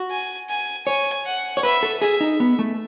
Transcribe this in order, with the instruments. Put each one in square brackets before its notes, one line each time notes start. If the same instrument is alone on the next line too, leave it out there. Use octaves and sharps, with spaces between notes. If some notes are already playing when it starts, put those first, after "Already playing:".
Already playing: [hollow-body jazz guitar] F#4
[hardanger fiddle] G#5
G#5
[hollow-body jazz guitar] C#5 [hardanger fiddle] G#5
[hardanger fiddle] F#5
[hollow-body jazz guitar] C#5
[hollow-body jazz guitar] B4 [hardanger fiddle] E5
[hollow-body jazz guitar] A4
[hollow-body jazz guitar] G#4 [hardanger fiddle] E5
[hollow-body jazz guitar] D#4
B3
A3